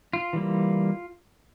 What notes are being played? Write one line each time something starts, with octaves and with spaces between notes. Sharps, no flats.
F4
E3 G3 A#3